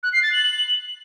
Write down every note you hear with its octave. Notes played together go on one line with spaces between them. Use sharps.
F#6
C7
A6
F#7